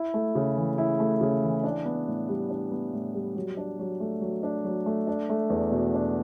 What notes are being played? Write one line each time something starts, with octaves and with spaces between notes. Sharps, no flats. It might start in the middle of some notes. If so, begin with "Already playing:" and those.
Already playing: E4
A3
C#3
E3
E4
A3
C#3
E3
D4
B3
A2
G3
D4
B3
A2
G3
F#3
D4
F#3
A3
F#3
D4
F#3
A3
D4
A3
E2
B2
D4